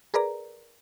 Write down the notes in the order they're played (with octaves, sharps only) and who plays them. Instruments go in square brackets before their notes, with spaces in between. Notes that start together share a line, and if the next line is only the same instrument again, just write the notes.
[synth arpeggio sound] G#4 A#4 B4 D5 A#5